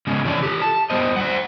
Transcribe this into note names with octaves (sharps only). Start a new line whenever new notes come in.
C#3 G#3 B3 C#4
C3 E3 D4 E4 C#5 D5
G4 A4
A5
G3 B3 C5 D#5
C5 D5 F#5